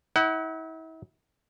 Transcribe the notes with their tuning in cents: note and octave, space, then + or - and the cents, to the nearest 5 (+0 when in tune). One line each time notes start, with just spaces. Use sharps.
E4 -40 F#5 +25